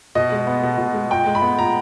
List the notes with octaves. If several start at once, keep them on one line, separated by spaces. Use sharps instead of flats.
B2 D#5
G#3
B3
B2
B2
G#3
A#2 G5
G#3
B5
B3
A#2 A#5